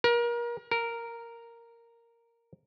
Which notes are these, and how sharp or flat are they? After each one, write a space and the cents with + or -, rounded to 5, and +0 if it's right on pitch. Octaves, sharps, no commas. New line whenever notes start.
A#4 +30
A#4 -5